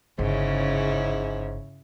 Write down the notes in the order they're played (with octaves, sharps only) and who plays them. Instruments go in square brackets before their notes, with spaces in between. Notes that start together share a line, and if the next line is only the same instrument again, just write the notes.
[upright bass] G1 [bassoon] G#2 [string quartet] C#3 C#4 E4